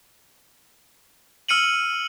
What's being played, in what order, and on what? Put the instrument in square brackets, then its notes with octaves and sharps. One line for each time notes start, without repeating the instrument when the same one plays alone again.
[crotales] E6 F6 C#7 D#7 F#7